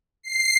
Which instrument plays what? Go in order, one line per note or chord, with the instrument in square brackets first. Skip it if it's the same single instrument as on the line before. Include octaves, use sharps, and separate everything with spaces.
[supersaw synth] C7